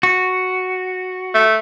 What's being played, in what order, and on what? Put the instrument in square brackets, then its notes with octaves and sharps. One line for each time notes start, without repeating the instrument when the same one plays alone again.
[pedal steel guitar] F#4
[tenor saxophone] A3